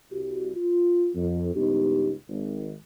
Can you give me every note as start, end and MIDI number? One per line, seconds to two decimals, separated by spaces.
0.12 0.51 36
0.12 0.51 66
0.12 0.51 67
0.56 1.08 65
1.15 1.54 41
1.55 2.12 37
1.55 2.12 43
1.55 2.12 59
1.55 2.12 63
1.55 2.12 67
2.29 2.72 32